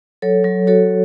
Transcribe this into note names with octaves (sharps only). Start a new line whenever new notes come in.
F#3 A4 C#5
F#3
F#4 A4 C#5